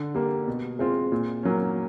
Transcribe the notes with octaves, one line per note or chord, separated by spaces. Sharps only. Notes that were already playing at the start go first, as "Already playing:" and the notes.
Already playing: D3
G3 A#3
B2
G#3 C4 F4
A#2
F#3 A#3 C#4